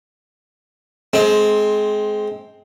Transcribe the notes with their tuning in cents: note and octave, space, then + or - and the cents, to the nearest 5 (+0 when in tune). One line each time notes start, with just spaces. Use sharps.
G#3 +25 C4 +0